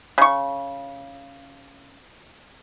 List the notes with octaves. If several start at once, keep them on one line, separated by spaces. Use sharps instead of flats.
C#3 C#6